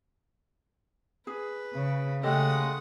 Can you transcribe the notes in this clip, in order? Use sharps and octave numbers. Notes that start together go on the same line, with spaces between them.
G#4 B4
C#3
C#3 G#3 A3 G4 A4 D#5 F#5 D#6